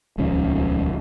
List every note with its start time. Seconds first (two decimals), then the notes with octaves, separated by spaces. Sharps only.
0.18 D#1 C#2 F3 C#4